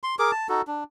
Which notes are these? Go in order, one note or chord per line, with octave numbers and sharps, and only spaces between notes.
C6
G#4 A#4 D6
A5
D#4 F#4 A4
D4